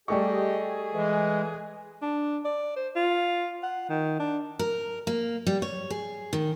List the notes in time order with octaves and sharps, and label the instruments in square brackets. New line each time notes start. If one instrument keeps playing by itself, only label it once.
[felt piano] G3 A3 C#6 [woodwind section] G4 D#5 [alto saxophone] G#4
[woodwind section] E3 [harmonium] G#3
[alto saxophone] D4
D5
C5
F4
F#5
D#3
D4
[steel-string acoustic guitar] A#4
A#3
G3
C#5
G#4
D#3